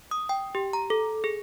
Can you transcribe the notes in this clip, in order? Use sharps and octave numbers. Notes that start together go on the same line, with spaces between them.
D#6
G5
G4
A#5
A4
G#4